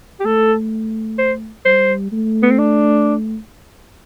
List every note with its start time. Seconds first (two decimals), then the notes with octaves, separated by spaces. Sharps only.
0.20 G4
0.25 A3 A4
1.19 C5
1.65 G3 C5
2.12 A3
2.43 B3
2.51 C4
2.59 D4